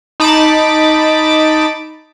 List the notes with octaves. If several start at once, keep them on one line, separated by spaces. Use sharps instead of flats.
D#4 A5 B5 D6 A6